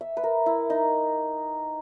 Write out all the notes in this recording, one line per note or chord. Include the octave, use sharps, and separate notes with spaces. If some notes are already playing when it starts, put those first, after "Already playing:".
E5
B4
A#4
E4
D#4